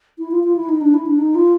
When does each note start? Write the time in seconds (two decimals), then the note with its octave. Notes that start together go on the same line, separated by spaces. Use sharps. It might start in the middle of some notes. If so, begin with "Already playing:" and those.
0.18 E4
0.31 F4
0.44 F4
0.56 E4
0.69 D#4
0.81 D4
0.94 E4
1.06 D4
1.19 D#4
1.35 F4